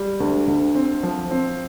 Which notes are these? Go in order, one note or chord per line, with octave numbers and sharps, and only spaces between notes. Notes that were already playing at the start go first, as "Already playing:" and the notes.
Already playing: G3
D2
D2
C4
F3
C4